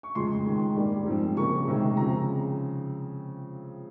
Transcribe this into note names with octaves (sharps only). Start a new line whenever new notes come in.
C#6
F2 C#3 G#3 C6
F2 D#3 G#3
G#2 G3 A#3
G#2 F3 C4
C#3 F3 A#3 C#6
C3 D#3 G#3 C4
C#3 F3 C4 A#5